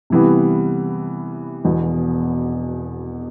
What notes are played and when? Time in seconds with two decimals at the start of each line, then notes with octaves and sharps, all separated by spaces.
0.10 C3 E3 G3 B3
1.65 E1 E2 B2